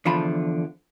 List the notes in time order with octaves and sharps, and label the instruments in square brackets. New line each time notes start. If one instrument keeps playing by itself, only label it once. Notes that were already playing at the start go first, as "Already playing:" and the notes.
[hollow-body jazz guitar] E2 D3 F3 F4 A5 B5